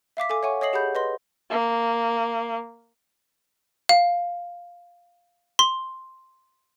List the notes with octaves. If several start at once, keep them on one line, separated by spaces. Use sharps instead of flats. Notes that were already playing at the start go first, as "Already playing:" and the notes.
E5 F5 D6 B6
A4 G#5 D6
C#5 E5 F#5 G#5 C#6
C#5 D#5 D#6 C7 F#7
G4 G#4 F#5 B5 G6
B4 D#5 C6
A#3
F5
C6